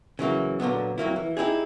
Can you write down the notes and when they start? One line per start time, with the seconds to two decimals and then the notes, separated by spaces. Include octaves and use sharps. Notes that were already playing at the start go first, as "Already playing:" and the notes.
0.19 C#3 E3 F#3 A#3
0.60 A#2 D3 F#3 B3
0.98 F2 F#3 A#3 E4
1.16 E3
1.37 D#4 E4 G4 G#4